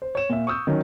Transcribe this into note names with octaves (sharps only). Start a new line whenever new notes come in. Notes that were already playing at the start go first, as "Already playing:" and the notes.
C5
C#5 E7
A#2 E5
C#6 D#6 E6 G6
D#3 F#3 C#4